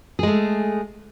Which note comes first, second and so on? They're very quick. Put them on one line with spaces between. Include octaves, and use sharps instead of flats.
G#4 G#3 A3